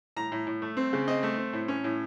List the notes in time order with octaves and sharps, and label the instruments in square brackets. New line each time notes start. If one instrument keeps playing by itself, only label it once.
[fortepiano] A2 A#5
A2
A2
A3
C4
C#3
C4 D#5
A3
C4
A2
C#4
A2